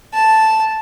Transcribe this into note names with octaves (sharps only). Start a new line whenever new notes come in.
A5